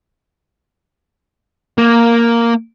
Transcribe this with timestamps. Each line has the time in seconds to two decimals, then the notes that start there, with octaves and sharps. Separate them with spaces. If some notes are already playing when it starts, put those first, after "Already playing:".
1.78 A#3